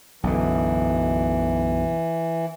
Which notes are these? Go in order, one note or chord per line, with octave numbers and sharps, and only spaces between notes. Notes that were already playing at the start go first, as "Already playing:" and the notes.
B1 F#2 D3 E3